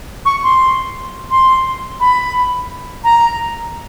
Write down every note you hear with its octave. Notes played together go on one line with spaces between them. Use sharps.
C#6
C6
C6
B5
A#5